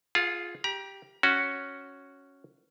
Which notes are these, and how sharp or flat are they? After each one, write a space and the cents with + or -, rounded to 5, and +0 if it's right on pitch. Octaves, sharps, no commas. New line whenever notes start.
F4 +0 G#4 +10 F#5 -45
G4 +0 A#5 +35
C#4 +0 F#4 +0